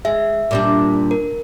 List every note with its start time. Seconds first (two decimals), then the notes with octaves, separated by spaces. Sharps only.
0.05 G#3 E5
0.51 A#2 G3 D4
1.11 A#4